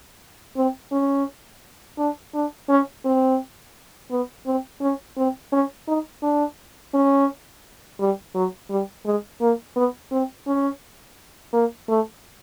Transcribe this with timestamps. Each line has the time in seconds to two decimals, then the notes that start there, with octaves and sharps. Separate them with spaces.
0.57 C4
0.92 C#4
1.98 D4
2.34 D4
2.69 C#4
3.05 C4
4.10 B3
4.46 C4
4.81 C#4
5.17 C4
5.52 C#4
5.88 D#4
6.23 D4
6.94 C#4
8.00 G3
8.35 F#3
8.70 G3
9.05 G#3
9.41 A#3
9.76 B3
10.11 C4
10.47 C#4
11.53 A#3
11.89 A3